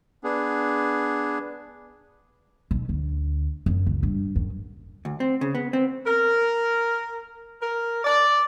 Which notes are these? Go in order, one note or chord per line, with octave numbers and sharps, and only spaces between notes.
B3 D4 G#4
B1
D2
F#2
C#2
G2
F#2
D2
C4
C#3
B3
C4
A#4
A#4
D5